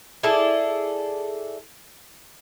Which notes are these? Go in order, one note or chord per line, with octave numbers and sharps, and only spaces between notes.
E4 G#4 A4 D5